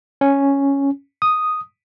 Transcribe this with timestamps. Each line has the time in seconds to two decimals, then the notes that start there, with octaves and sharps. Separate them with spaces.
0.21 C#4
1.22 D#6